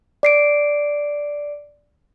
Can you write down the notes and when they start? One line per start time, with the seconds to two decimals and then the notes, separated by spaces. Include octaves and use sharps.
0.23 D5 C7 D7